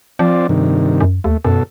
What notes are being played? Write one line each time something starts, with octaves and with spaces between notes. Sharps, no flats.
F3 C4 F4 D5
G2 C3 D#3
F#2
D#2 A3
F#2 B2 A4